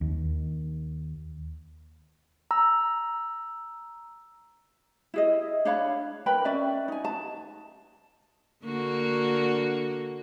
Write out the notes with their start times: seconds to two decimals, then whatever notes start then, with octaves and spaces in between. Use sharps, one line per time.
0.01 D#2
2.51 A#5 E6
5.14 E4 G#4 D#5
5.65 D4 C#5 F5 B5
6.26 A#4 B4 G5 B5
6.45 C#4 D5 E5
6.88 D#4 G#5
7.05 A5
8.65 D3 A#3 F#4